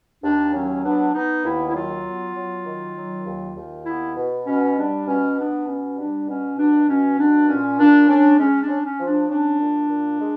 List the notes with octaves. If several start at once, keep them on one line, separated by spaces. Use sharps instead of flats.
D#2 D4
F#3 C#4
B3 D4
B3 D#4
D#2 E4
E4
F#3 F4
B3
F#3
D#3
F#3
D#2
D#2
B3 E4
B2
B2 C#4
G3 D4
B2 C#4
B3 D4
B2 C#4
G3 D4
B2 C#4
B2 D4
B2 C#4
B2 D4
A#2 C#4
A#2 D4
C#4 D4
G#3 C#4
D4
C#4
C#4
F3
D4
C#4 D4
A#2
A#2
G#3